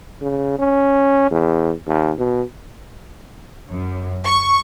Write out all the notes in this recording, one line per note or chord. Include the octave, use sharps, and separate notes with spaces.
C#3
C#4
E2
D#2
B2
F#2
C#6